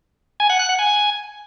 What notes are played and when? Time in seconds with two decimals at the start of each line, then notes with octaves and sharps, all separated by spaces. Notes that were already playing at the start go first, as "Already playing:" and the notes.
0.40 G#5
0.50 F#5
0.59 F#6
0.69 F#5
0.79 G#5